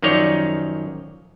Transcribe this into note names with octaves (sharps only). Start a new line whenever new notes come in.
F#2 D#3 F3 D#4 C#5 D5